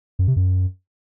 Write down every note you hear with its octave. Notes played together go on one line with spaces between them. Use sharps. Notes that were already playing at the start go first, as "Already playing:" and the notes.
F#2
C3
F#2